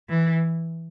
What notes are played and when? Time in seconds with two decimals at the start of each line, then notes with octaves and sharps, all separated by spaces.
0.10 E3